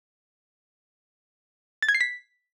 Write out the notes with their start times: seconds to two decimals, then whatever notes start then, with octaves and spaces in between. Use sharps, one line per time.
1.82 A6
1.89 G#6
1.95 C7
2.01 B6